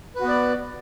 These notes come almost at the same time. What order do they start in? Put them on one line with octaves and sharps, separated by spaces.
B4 F#4 B3 D5